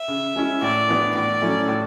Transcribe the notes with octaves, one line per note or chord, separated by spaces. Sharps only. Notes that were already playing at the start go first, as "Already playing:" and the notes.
Already playing: E5
C#3
G#3 C#4 E4
A2 D5
E3 B3 D4
A2 D5
F#3 A3 C#4 E4
A2